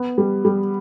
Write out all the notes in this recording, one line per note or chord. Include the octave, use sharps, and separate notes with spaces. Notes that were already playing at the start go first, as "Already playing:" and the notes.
Already playing: B3
G3
G3